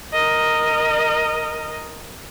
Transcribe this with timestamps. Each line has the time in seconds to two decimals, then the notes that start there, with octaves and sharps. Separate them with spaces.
0.13 A#4 D#5